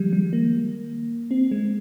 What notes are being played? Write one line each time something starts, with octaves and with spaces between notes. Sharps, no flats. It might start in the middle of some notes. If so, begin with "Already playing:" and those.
Already playing: D#3 F3 G3 G#3
G3
A#3
C4
G#3